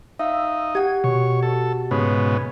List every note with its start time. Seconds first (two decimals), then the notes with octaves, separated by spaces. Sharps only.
0.19 D#4 E5 F5 E6
0.75 G4 F#5 G#6
1.04 B2 C#5
1.43 A4
1.91 G#2 C#3 B3